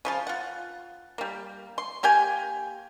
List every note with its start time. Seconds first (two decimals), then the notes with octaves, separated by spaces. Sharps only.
0.05 C#3 F3 F4
0.27 F4 F#5
1.18 G3 A#3
1.78 C6
2.03 A#3 G4 G5 G#5